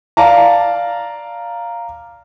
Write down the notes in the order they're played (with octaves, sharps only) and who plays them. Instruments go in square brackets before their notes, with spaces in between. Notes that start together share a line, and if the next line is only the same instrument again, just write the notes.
[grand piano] D5 F5 A5 A#5